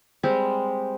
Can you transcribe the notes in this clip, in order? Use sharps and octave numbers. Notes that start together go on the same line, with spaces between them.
G3 G#3 C4 G4